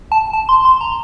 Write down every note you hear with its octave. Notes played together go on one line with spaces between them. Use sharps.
A5
A5
C6
C6
A#5